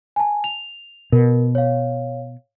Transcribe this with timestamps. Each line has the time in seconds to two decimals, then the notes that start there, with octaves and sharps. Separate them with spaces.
0.16 G#5 A5
0.44 F7
1.12 B2 A#4
1.55 C#5 F5